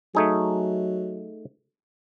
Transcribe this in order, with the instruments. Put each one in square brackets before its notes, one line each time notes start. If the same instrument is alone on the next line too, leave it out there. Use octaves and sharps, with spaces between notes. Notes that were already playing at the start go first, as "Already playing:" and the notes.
[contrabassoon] F#3 [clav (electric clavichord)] A3 D#4 G#4